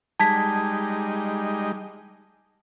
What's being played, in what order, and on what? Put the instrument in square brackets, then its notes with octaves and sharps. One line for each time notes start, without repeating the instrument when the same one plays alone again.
[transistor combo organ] G3 G#3 D#4 [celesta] A5 G#6 B6